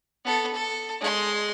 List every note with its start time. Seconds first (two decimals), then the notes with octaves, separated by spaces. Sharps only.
0.25 B3 A4
0.54 A4
1.00 G#3 C6